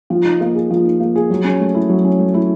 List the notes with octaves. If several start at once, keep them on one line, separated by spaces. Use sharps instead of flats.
F3
D#4
A#3
G#4
F3
D#4
A#3
G#4
F#3
C#4
A3
E4
F#3
C#4
A3
E4